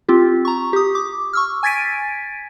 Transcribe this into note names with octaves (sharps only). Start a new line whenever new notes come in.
C4 F4 G4
A#5 C#6
G4 D#6
D6
C#6 E6 F6
G#5 G#6 A6 B6 D7 D#7